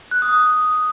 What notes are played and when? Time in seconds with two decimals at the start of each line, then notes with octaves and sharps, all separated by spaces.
0.11 F#6
0.22 D#6
0.33 D#6